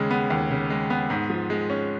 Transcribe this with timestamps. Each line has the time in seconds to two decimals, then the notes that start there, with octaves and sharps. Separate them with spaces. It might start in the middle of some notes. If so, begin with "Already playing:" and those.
Already playing: D#2 C#3 G#3
0.11 B3
0.30 D#2
0.51 C#3
0.70 G#3
0.90 B3
1.10 G#2
1.30 F3
1.50 G#3
1.70 C#4